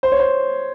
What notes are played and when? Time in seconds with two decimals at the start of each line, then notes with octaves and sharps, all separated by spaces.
0.03 C5
0.12 C#5
0.20 C5